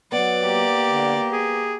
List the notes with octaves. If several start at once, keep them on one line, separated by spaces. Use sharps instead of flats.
F#3 B3 D5 F#5
A#3 G4
D3
G#4